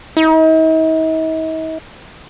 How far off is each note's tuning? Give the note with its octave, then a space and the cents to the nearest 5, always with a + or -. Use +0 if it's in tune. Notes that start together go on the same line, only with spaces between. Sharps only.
D#4 +45